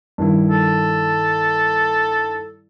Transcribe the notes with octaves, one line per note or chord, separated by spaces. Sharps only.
G2 D#3 E4
A4